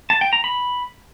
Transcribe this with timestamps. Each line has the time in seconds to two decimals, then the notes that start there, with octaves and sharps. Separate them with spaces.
0.10 A5
0.21 G5
0.33 A#5
0.44 B5